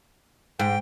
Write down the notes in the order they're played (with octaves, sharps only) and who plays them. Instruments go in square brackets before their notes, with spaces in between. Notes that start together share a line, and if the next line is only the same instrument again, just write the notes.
[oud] G#2 [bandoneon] G5